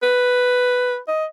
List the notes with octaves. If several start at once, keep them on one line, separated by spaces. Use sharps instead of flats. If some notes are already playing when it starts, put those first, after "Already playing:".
B4
D#5